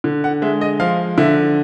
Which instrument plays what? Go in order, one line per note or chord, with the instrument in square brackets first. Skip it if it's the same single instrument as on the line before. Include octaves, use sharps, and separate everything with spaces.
[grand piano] D3
F#5
G#3 E5
D#5
F3 F5
D3 E5